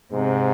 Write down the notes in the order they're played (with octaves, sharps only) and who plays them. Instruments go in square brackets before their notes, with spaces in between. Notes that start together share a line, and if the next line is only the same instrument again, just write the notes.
[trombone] G#2 [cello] C3